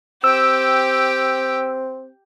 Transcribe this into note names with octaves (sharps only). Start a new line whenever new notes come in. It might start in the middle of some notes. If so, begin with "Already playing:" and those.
C4 G4 G5 E6